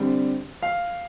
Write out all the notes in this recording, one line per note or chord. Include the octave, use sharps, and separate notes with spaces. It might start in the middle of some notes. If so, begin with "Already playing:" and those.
Already playing: D3 G3 C4
F5